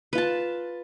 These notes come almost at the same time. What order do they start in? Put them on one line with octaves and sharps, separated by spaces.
B4 F4 A5